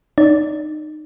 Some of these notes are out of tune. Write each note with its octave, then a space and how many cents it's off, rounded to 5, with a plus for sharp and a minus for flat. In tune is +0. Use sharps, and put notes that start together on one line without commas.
D#4 -25 D5 -30